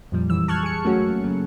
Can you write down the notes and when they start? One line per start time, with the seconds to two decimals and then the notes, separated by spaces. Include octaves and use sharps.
0.12 F2 A#2 F3 G3
0.30 F#2 E3 E6
0.48 A5 C#6 F6 F#6 G#6
0.63 G#4 C#7
0.84 F#3 A3 A#3 C#4 F#4
1.24 C#3 F#3